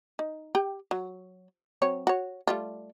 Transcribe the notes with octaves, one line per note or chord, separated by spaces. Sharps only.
D#4
G4 G5
F#3
F#3 C4 C#5
F#4 C#5
G3 A3 F4